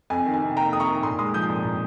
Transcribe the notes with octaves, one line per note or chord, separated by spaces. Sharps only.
F2 G#5
D#3
G#5
C3
A#3 G5 A#5
F2 D#6
A#5 C#6
D#3
A#2 C6 D#6
G#3 C6 D#6
F3 D#6 G6
A#2
A#2